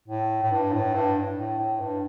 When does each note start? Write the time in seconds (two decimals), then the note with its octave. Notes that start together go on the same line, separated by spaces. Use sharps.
0.08 A2
0.42 A2
0.51 G2
0.72 A2
0.94 G2
1.37 A2
1.58 A2
1.80 G2